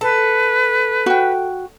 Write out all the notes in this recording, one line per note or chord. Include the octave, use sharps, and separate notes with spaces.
A4 B4
F#4 G5